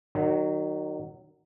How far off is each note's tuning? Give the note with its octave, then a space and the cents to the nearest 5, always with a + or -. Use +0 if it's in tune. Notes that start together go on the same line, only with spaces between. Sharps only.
D#3 -30 F#3 +10